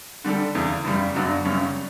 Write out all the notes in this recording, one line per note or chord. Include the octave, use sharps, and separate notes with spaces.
D3 G3 D4 A4
E2 C#3 E3
F#2 C#3 G3
F#2 C#3 F#3 B3 D4
F#2 C#3 G3 C#4